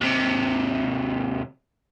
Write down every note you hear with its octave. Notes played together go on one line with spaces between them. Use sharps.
D#2 C3